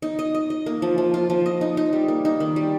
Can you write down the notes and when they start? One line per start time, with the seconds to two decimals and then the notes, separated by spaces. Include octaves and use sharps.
0.02 D#4
0.19 D#5
0.35 D#5
0.50 D#5
0.66 A#3
0.82 F3
0.98 F3
1.14 F4
1.30 F3
1.46 D#5
1.61 D#4
1.77 D#4
1.93 G3
2.08 A#3
2.25 D#4
2.40 D#3
2.56 G3